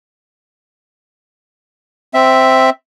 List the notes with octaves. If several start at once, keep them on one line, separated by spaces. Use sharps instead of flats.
C4 E5